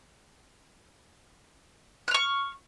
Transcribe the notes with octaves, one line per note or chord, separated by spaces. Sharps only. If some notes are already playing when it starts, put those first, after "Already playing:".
C#6 F6 F#6